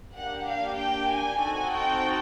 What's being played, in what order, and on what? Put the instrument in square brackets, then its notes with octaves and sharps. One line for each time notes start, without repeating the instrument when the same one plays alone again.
[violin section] A#3 D4 G4 F#5
F5
G5
G#5
C4 D#4 F#4 A4
G5